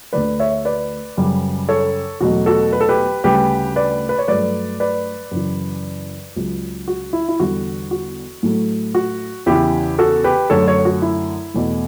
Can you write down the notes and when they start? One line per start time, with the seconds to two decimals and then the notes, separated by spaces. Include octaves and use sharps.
0.13 D2 D3 A3 B4 D5
0.40 C#5 E5
0.65 B4 D5
1.17 F#2 C#3 G3
1.69 A4 C#5
2.20 E2 B2 F#3 A3 F#4
2.46 F#4 A4
2.73 B4
2.81 A4
2.89 G4 B4
3.24 D2 C#3 G3 G4 B4
3.76 B4 D5
4.09 B4
4.19 C#5
4.28 G2 F#3 A3 B4 D5
4.80 B4 D5
5.31 F#2 C#3 E3
6.36 C#2 C#3 F#3
6.88 F#4
7.13 E4
7.29 E4
7.40 E2 D3 G3 F#4
7.91 F#4
8.43 A2 F#3 A3
8.95 F#4
9.46 E2 C#3 E3 E4 G4
9.99 F#4 A4
10.24 G4 B4
10.50 F#2 D3 A3 A4 C#5
10.68 A4 C#5
10.85 F#4
11.02 E4
11.54 E2 B2 A3